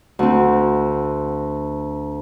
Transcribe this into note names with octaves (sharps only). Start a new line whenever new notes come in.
D2 C4